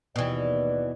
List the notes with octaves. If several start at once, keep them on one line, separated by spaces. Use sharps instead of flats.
D#2 B2 E3 D5